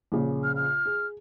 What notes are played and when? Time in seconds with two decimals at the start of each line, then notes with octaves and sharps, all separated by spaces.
0.12 A#1 C#3
0.43 F6
0.56 F6
0.86 G#4